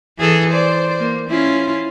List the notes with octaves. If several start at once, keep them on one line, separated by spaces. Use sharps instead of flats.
E3 G#4 A4
C5 D5
A#3
C#4 E4 F4